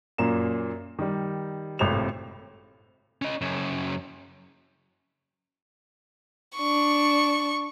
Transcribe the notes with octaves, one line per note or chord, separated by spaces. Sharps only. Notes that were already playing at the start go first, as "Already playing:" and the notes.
F#2 A#2 A#3 A#5 E7
D#3 G3
G#1 A2 C3 C5 F7
C#4 D#5
F#2 C#3
D4 C#6